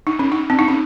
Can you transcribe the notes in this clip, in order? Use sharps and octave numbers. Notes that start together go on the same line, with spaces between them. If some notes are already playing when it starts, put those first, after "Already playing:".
D#4
C#4
D#4
C4
D#4
C#4